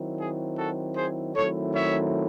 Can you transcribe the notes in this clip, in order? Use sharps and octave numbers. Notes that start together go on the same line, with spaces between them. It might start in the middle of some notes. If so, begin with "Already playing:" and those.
Already playing: D#3 F#3 C4 E4
G#4
F#4 A4
G#4 C5
D#3 F#3 A3 C4 E4 A4 C#5
C#5 E5